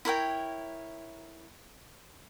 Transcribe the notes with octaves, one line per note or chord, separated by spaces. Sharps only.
E4 A#4 C#5 G5